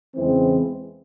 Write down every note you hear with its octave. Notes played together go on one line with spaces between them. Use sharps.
E2 C#3 E3 G#3 C4